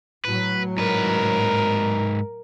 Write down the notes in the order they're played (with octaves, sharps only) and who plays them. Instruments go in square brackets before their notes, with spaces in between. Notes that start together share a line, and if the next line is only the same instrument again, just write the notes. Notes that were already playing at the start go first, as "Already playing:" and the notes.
[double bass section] A2 F#3 [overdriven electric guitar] B4
[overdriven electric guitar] G#2 B4 [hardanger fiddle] A#4